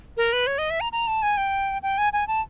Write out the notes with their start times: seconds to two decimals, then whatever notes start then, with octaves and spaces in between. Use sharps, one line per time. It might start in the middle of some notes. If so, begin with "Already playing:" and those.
0.17 A#4
0.33 B4
0.47 C#5
0.58 D#5
0.70 E5
0.81 A#5
0.92 A#5
1.07 A5
1.23 G#5
1.37 G5
1.83 G5
1.98 G#5
2.13 G#5
2.28 A5